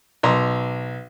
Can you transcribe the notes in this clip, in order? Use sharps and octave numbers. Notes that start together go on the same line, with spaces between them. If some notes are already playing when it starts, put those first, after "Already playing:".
B1 A#5 C6